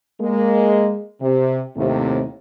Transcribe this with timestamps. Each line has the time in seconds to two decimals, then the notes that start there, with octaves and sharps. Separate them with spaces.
0.21 G#3 A#3
1.21 C3
1.76 D#2 A2 C3